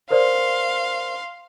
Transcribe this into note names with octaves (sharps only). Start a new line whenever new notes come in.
A#4 C5 D5 F5 C6